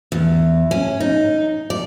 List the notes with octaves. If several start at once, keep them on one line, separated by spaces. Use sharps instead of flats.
E2
C#4
D#4
D5